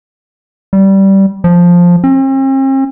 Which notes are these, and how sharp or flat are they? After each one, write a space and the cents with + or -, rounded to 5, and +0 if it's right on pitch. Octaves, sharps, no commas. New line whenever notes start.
G3 -15
F3 +5
C4 +45